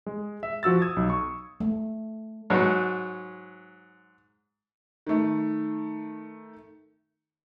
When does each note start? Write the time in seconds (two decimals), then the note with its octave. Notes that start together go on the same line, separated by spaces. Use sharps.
0.06 G#3
0.43 E5
0.63 F3 F#4 E6 A6
0.82 D#6 G#6
0.96 B1
1.10 C#6
1.60 A3
2.50 G#2 F#3
5.07 D#3 A3